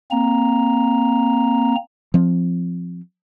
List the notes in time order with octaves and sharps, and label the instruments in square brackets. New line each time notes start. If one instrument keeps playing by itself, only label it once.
[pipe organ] A#3 C4 A#5
[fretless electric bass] F3 C4